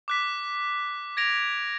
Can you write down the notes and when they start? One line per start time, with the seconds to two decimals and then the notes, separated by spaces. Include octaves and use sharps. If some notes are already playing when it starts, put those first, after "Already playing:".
0.08 D6 F#6 B6
1.17 G#6 A#6 D7 F7